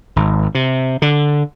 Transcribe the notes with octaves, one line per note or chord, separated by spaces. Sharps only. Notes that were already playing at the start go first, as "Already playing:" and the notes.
G#1
C3
D3